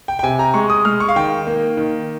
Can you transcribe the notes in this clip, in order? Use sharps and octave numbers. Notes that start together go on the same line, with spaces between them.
G5
G5
C3 G#5
A#5
G#3 C#6
D#6
G#3 F6
C#6
F5
D#3 G5
A#3
D#3